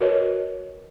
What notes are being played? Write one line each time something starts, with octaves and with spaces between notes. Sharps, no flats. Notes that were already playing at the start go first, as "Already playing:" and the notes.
F#4 A#4 B4 C#5 D#5